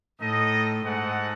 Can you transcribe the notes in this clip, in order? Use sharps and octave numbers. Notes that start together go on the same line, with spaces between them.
A2 D#4 A4 D#5
G#2 D#4 A4 D#5 F#5